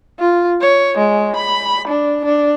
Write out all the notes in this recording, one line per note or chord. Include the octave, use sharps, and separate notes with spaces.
F4
C#5
G#3
B5
D4
D4